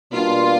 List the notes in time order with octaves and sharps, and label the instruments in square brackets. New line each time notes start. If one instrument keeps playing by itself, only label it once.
[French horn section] B2 G3 A#3 D4 [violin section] F4